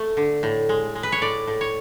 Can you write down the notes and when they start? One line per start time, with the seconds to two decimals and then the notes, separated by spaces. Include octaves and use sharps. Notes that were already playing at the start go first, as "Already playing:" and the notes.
Already playing: A3
0.17 D3
0.43 A2
0.69 G#3
0.95 G#3
1.03 B4
1.12 C#5
1.22 A2 D5
1.47 A2
1.61 C#5